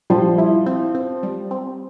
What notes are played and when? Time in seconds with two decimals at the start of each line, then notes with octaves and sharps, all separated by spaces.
0.10 F3 G3
0.38 E4
0.66 C4
0.95 C4
1.23 G3
1.51 C4